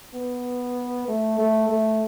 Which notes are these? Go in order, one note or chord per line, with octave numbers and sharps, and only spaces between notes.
B3
A3
A3
A3